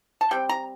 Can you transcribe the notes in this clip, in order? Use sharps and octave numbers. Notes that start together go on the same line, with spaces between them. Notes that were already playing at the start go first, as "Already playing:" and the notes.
A5
G3 C4 G5
A#5